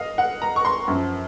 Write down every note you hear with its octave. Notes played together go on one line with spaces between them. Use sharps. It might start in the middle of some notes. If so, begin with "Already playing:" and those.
Already playing: D#5 F5
F#5
A#5
C#6
C6
F#2 F3